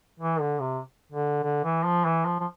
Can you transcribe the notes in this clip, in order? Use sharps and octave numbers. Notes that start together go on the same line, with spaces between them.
E3
D3
C3
D3
D3
E3
F3
E3
F3
F3